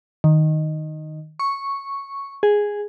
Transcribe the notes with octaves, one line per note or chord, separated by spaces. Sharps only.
D#3
C#6
G#4